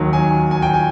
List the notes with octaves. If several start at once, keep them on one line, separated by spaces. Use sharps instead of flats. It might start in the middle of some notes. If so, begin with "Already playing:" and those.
Already playing: D#2 D#3 F#3
G#5
G#5
G5
G#5